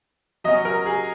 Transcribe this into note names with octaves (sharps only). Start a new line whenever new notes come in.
F#3 C#4 D#5
A#4
G#4